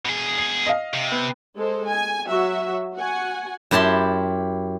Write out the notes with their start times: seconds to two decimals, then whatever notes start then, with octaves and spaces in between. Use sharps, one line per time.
0.05 B2 G#4
0.38 C7
0.66 D#5 F5
0.94 C3
1.12 B3
1.55 G#3 A4 C5
1.89 G#5
2.26 F#3 F#4 E5
2.95 F#4 F#5 G#5
3.71 F#2 E4 G4 A5 C6